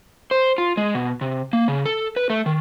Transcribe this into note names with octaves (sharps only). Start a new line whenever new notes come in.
C5
F4
G#3
B2
C3
A#3
C#3
A4
B4
A3
D#3